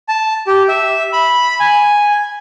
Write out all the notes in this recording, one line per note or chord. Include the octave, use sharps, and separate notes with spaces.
A5
G4
E5
B5
G#5